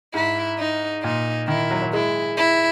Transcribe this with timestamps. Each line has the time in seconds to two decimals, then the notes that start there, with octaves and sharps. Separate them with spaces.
0.14 G#2 E4
0.59 D#4
1.04 A#2 D#4
1.48 D#3 E4
1.71 F#3
1.82 F#3
1.93 G#3 E4
2.37 E4